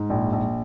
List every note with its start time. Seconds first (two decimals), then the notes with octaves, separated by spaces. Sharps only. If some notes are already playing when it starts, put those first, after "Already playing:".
Already playing: G#2
0.10 A#1
0.32 A#1